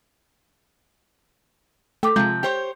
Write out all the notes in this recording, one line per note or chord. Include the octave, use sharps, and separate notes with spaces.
A3 A4 G5 D6 B6
C3 F3 G#3 F4 G6
G4 C5 C#5